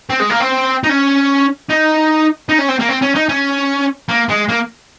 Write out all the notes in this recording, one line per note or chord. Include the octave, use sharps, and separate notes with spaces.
C4
G#3
A#3
C4
D#4
C#4
D#4
D#4
C#4
C4
A#3
C4
C#4
D#4
C#4
A#3
G#3
A#3